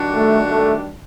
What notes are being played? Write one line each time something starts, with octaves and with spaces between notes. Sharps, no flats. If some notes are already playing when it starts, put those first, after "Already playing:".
Already playing: D#3 G3 D4 F#4
A3
A3